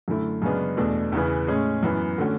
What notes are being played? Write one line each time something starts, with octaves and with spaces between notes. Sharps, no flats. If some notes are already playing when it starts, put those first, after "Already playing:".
F#2 D3 A3 E4
F#2 C#3 G#3 B3 D4
E2 B2 A3 D4
E2 C#3 E3 B3
A2 G#3 C#4 G#4
F#2 E3 B3
D3 A3 C#4 F#4